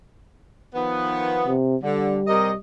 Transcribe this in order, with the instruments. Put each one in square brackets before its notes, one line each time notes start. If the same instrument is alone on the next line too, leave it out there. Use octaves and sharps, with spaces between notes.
[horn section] D#3 F3 B3
[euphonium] C3
[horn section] D3 [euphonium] G3
[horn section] C3 A#4 D#5